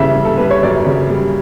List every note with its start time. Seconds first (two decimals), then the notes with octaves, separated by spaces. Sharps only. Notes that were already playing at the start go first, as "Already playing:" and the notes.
Already playing: C#3 E3 G3 E5
0.16 G3
0.25 A4
0.37 G3 B4
0.51 C#5
0.63 F#2 D5
0.86 C#3
1.10 G3